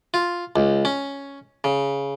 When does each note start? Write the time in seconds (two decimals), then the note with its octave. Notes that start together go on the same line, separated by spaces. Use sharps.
0.14 F4
0.56 C#2
0.85 C#4
1.64 C#3